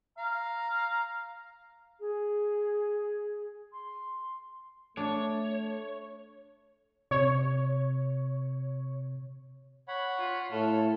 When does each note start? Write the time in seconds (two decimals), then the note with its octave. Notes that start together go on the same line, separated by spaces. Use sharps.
0.18 F5 A#5
2.00 G#4
3.72 C6
4.97 A3 D4 C#5
7.11 C3 C#5
9.88 C#5 F#5 B5
10.18 F4
10.52 A2 A4 C#5 F6